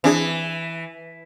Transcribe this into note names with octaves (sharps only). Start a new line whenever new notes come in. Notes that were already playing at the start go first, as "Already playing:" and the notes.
E3 C4 D4 G#4